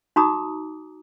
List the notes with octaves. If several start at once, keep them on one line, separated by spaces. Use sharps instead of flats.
D#4 F#4 A#5 D6 D#6